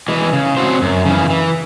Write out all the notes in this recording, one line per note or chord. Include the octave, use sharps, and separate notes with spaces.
E3 G#3
C#3
F#3 C4 F#4 C5
F#2
C#3 E3
E3